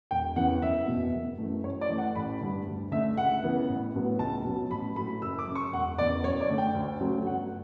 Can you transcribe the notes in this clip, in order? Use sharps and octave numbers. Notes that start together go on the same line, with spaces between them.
E1 G5
E2 C#3 E3 F#5
F#1 E5
E2 B2
F#1
F#2 E3 A3
F#2 C#5
D5
E3 A3
F#5
A1 B5
G2 D3
D2
D3 A3 E5
C#2 F#5
C#3 E3 B3
A1
A2 F#3 B3
C#2 A5
B2 F#3
A1 B5
A2 F#3 A3 B5
F#1 E6
D6
F#2 C#3
C#6
E1 F#5
E2 C#3 D5
F#2 C#5
D5
D3 A3
G5
D2
C#3 F#3 A3
G1 F#5